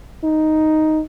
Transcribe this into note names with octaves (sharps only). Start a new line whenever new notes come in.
D#4